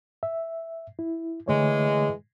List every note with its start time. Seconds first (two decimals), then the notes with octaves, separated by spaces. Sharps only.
0.23 E5
0.99 E4
1.48 D3 E3 G#3 A3 C#5